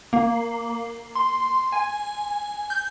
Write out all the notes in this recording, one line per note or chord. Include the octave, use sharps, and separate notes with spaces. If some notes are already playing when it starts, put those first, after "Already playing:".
A#3
C6
G#5
G6